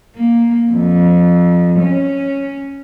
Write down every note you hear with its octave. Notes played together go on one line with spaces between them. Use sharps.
A#3
F2
C#4